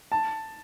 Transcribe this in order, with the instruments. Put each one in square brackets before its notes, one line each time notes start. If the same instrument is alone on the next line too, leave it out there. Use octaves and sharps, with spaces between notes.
[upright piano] A5